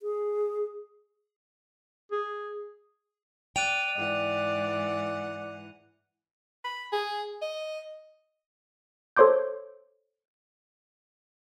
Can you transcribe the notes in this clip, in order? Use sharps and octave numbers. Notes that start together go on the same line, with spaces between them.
G#4
G#4
D5 G5 F#6 D#7 F7
G#2 E3 D5 F#5
B5
G#4
D#5
A4 C5 C#5 C6 D6 G6